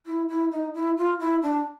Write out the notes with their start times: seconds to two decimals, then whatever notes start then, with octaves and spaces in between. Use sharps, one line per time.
0.06 E4
0.29 E4
0.51 D#4
0.74 E4
0.97 F4
1.20 E4
1.42 D4